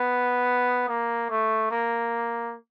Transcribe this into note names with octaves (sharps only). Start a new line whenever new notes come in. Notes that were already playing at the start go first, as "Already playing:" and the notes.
Already playing: B3
A#3
A3
A#3